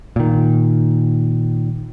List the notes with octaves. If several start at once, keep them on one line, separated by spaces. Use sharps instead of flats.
A#2 D#3